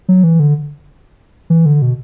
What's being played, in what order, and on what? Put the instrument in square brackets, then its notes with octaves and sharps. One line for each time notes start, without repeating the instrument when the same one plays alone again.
[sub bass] F#3
E3
D3
E3
D3
B2